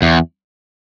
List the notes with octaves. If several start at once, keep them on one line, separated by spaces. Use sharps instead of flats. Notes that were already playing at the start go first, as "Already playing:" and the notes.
E2